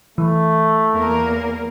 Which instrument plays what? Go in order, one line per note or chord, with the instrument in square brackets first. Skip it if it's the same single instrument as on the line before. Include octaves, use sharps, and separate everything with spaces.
[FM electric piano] E3 [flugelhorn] A3
[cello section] E2 A#3 A#4